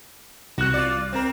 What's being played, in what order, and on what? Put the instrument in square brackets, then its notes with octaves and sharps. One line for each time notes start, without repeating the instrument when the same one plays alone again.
[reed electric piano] C2 F#6 [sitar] F#4
[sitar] F4 D5
C4 A#4